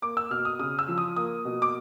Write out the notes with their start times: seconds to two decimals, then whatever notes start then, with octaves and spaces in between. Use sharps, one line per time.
0.02 A#3 D6
0.17 E6
0.31 B2 F6
0.45 D#6
0.59 C#3 D#6
0.79 E6
0.88 F3
0.98 D#6
1.16 A#3 D#6
1.45 B2
1.62 D6